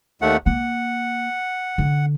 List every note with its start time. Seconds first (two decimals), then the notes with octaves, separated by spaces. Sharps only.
0.22 D#2 A3 F#5
0.46 A#3 F#5
1.78 D3